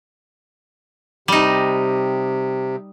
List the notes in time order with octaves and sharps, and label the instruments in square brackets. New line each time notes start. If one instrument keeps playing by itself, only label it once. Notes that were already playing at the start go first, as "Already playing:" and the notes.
[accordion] C3 [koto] G3 D#4